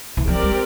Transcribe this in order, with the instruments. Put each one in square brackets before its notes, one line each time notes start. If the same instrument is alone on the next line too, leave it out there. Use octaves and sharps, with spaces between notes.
[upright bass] E3
[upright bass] F3 [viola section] C4 G4 A#4 D5
[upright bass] G3